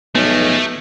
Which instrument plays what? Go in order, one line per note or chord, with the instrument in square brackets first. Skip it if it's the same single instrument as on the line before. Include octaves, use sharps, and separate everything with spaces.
[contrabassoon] B1 [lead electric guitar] F3 G#3 [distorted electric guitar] A3 [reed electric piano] B3